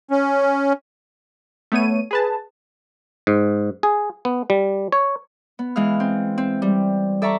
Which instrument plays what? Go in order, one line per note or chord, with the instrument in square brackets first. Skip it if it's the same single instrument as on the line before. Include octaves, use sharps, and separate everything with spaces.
[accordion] C#4
[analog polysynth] A3 B3 C#5 D#7
G#4 B4 A5
[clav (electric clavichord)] G#2
G#4
B3
G3
C#5
[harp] B3
E3 G#3 F5 F6
C4
C4
G3
A4 D5 E5 A5 A#5 C#6